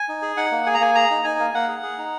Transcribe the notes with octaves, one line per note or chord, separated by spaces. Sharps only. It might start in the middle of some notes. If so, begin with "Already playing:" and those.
Already playing: G#5
D#4
G#4
D#4 F#5
A#3
G#4 G#5
A#5
A#3 G#5
G#4 A#5
D#4
D#4 G#5
A#3
A#3 F#5
G#4
G#4
D#4